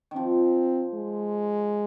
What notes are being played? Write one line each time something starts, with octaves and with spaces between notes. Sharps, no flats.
D#3 F3 C4
G#3